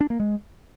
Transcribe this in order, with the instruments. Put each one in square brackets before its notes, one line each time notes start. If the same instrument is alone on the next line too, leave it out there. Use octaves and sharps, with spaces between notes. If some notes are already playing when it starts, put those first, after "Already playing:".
[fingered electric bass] D4
A#3
G#3